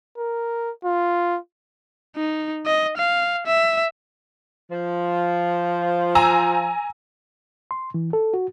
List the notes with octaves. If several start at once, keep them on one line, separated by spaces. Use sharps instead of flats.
A#4
F4
D#4
D#5
F5
E5
F3
G#5 A#5 E6
C6
E3
A4
F#4